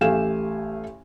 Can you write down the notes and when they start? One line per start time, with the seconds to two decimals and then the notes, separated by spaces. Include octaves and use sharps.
0.01 A1 A3 G4 F5 G#5 E7